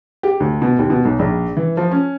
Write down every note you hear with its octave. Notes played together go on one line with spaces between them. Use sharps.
G4
D2
B2
D#2
B2
B1
A#1
E3
F3
C#4